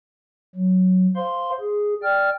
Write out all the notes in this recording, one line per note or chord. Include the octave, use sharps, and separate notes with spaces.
F#3
C5 F5 C6
G#4
D5 G5 F6